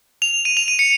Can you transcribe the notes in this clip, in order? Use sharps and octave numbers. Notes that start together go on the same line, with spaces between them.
F7
D#7
F7
D#7
C#7